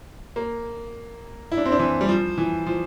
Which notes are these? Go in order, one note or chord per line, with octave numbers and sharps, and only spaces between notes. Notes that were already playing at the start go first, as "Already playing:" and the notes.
A#3
E4
D4
C4
D4
E3
G3
F3
E3
F3